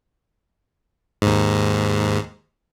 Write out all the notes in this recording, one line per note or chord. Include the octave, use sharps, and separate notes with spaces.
D#2 G#2